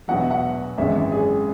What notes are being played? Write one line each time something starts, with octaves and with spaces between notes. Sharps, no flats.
E2 B2 F#3 B3 F#5
E5
F#5
G#1 F#2 C#3 E3 G#3 E5
G#4